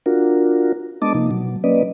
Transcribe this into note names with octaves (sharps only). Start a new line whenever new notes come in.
D4 F4 F#4 A#4
G#3 B3 D4 D#5 A5 D6
C3 F3 A#3 D#4
B2 F#3
F#3 A#3 C#4 B4 D5 D#5